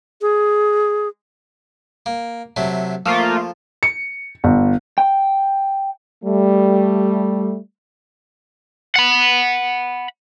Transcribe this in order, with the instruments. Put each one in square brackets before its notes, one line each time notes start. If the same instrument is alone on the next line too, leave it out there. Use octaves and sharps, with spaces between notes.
[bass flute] G#4
[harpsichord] A#3
C3 F#3 A3
[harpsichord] F3 [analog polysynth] A3 A#3 F4
[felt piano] C#7
G1
[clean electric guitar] G5
[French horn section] G3 A3
[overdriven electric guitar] F#5 B5